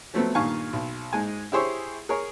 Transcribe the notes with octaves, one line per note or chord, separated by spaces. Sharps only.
F3 F#3 A3 B3 C4
G2 A#2 D#3 F5 G#5 C#6
B1
G#2 G#3 G#5
E4 G4 G#4 C5 C#5 E5
G#4 A#4 C#5